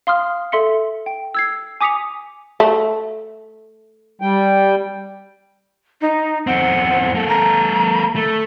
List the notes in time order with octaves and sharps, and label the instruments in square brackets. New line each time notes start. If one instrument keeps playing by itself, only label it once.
[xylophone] F5 C6 D#6 F6
A4 E5 C6 B6 C#7
G5
E6 G#6 C7
G#5 D6 D#6 B6 C#7 F7
[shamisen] A3
[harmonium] G3 G5
[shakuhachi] D#4
[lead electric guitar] E2 C4 [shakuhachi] F#5
[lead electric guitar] A#3 A4
[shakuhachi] A#5
[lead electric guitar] A3